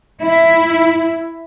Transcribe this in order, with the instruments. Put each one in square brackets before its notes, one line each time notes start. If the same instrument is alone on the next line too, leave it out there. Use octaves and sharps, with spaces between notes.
[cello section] E4